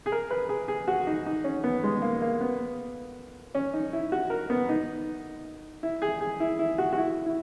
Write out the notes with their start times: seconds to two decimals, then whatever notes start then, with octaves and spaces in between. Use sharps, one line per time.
0.06 G#4
0.12 A#4
0.30 B4
0.49 G#4
0.68 G#4
0.88 F#4
1.07 D#4
1.26 D#4
1.44 C#4
1.64 B3
1.84 G#3
2.02 A#3
2.22 A#3
2.41 B3
3.55 C#4
3.73 D#4
3.93 E4
4.12 F#4
4.30 A#4
4.50 B3
4.69 D#4
5.83 E4
6.02 G#4
6.20 G#4
6.40 E4
6.59 E4
6.78 F#4
6.93 F#4
6.97 E4
7.26 E4